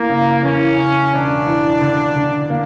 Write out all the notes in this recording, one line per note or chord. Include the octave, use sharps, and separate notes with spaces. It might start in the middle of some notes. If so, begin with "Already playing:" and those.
Already playing: E3 A#3
C#3
E2 C#4
C#3
E1 D4
E2
D3
D3
A#3